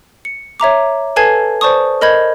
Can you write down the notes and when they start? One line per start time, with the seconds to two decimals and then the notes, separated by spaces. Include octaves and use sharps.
0.25 C#7
0.60 C#5 E5 A#5 D6
1.16 A4 B4 G#5 A5 G#6 C7
1.61 C5 D5 A5 C#6 D#6
2.01 A#4 D#5 B5 G6 G#6